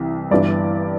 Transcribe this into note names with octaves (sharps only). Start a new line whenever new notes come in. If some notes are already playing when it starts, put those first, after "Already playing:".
Already playing: C2 C3 E3
G1 G2 E3 D5